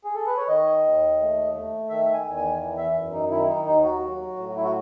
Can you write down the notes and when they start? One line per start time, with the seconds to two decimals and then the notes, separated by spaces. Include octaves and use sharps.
0.04 G#4
0.15 A4
0.26 B4
0.37 C#5
0.48 D#3 D#5
0.83 D#2
1.19 A3
1.54 A3
1.89 D#3 E5
2.13 G#5
2.24 E2
2.36 G#5
2.60 E3
2.77 E5
2.95 F#2
3.13 D#4
3.31 D#3 E4
3.48 D#4
3.66 D#2 D#4
3.83 F#4
4.01 F#3
4.36 A2
4.56 E4
4.64 F#4